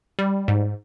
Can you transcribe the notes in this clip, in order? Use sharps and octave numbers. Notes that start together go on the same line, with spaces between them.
G3
G#2